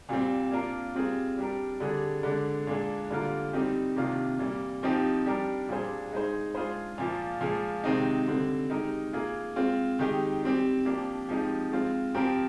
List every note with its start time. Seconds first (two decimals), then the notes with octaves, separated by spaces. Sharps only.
0.09 A#2 G3 C4
0.51 A#3 D4 F4 A#4
0.94 G3 C4 F4 G#4
1.38 G3 D4 G4 A#4
1.80 D3 G3 D4 G#4
2.23 D3 G#3 D4
2.67 A#2 G#3 D4
3.10 D3 G3 A#3 F4 A#4
3.53 G3 C4 D#4 G4
3.96 C3 D#3 A#3 D4 F4
4.39 A#2 G3 A#3
4.83 F3 C4 D#4 G4
5.26 G3 D4 G4 A#4
5.69 A#2 G3 D4 G#4 C5
6.12 G#3 D#4 G#4 C5
6.54 G#3 D4 F4 G#4 C5
6.98 A#2 F3 A#3 F4
7.40 A#2 F3 G#3
7.84 C3 D#3 G#3 C4 D#4
8.27 D3 G3 C4
8.70 G#3 D#4 G4 A#4
9.13 A#3 F4 G#4
9.56 G#3 C4 F4
9.99 D#3 G#3 D#4 G4
10.43 G3 C4 G4
10.85 F3 A#3 D4 G4
11.29 F3 G#3 C4 D#4 G4
11.71 G#3 C4 F4
12.14 F3 C4 G4 A#4